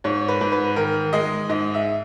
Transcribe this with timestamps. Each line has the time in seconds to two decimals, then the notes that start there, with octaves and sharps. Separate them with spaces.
0.04 G#2 C#5
0.28 B4
0.41 G#2
0.52 B4
0.76 D#3 A#4
1.13 G#3 D#5
1.49 G#2 D#5
1.74 E5